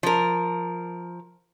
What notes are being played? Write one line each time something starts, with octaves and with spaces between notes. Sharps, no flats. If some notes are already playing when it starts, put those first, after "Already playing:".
F3 A#4